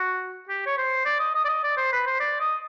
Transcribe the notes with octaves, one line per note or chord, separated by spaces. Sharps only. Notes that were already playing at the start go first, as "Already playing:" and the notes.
Already playing: F#4
G4
C#5
C5
D5
D#5
D#5
D5
D#5
D5
C5
B4
C5
D5
D#5